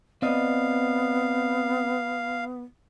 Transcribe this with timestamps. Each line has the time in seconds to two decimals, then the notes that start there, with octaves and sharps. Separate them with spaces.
0.22 B3 C4 D5 D#5 F5